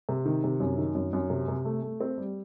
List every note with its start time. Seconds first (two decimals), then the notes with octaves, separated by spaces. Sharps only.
0.09 C3
0.26 D#3
0.44 C3
0.60 F#2
0.78 D#3
0.95 F#2
1.13 F#2
1.30 C3
1.48 C3
1.65 A3
1.83 A3
2.01 C4
2.18 G3